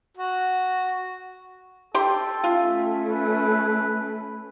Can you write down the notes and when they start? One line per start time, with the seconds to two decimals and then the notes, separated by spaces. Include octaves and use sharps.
0.17 F#4
1.94 G4 A4 G5 C6
2.44 A3 C#4 F4
3.09 B4